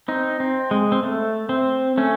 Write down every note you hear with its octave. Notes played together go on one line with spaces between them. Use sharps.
C4 D#4
C4
G#3
C4
A3
C4
A3 C#4